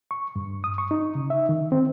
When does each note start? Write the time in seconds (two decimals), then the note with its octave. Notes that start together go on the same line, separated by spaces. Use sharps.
0.11 C#6
0.36 G2
0.64 D#6
0.78 C#6
0.91 D#4
1.15 C#3
1.30 E5
1.49 D#3
1.72 C4